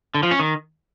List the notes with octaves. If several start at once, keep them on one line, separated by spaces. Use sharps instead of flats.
D3
F3
C#4
D#3